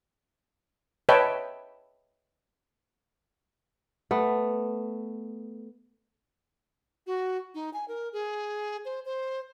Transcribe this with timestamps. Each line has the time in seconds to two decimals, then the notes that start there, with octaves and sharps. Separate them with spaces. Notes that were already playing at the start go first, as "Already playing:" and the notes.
1.09 B4 C#5 D#5 E5 G5 A5
4.11 A3 B3
7.07 F#4
7.55 D#4
7.74 G#5
7.88 A#4
8.13 G#4
8.85 C5
9.05 C5